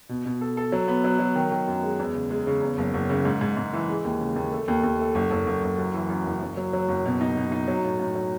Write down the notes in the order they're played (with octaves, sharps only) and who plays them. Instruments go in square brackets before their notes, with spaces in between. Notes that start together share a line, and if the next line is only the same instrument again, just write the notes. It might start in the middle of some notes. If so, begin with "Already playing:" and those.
[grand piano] B2
B2
A4
A4
F#3
B3
F#3
F#3
D#3
D#3
F#2
G#3
E2
C#3
G#3
C#3
E2
F#1
F#1
C#3
G#2
G#2
G#2
E3
G#3
D#2
C#3
D#2
A3
D#2
D#2
A3
F#1
F#1
F#1
F#1
F#2
E3
F#2
F#1
F#1
F#3
F#3
F#1
B2
D#4
B2
D#4
F#3
A2
A2
F#3